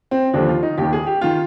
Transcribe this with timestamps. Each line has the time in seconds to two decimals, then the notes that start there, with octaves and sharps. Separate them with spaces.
0.11 C4
0.33 D#2 D3 F3 D4
0.48 F4
0.63 D#4
0.78 D#2 D#3 G4
0.92 G#4
1.07 G4
1.21 D#3 F4